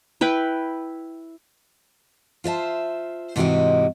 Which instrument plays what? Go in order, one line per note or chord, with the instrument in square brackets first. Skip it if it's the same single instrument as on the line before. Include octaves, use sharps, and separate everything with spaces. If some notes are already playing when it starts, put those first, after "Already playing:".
[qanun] E4 B4 G5
[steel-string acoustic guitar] F4 C5 E5 A5
G#2 C3 E3 F#4 G4 D#5